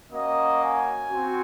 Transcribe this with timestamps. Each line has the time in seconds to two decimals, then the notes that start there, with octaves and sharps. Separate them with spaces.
0.11 A#3 C#4 F#4 D#5
0.61 G#5
1.09 C4 F#4